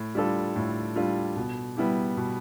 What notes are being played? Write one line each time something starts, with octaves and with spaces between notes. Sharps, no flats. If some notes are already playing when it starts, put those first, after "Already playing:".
Already playing: A2
G3 D4 F4 A4
A2
G3 D4 F4 A4
B2
G3 B3 E4 G4
B2